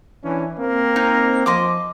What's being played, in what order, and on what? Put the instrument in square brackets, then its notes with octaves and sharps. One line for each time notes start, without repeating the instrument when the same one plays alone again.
[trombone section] E3 C#4 D4
A#3 C4
[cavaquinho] D#4
[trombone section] F3 [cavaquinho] D#5 C6 D6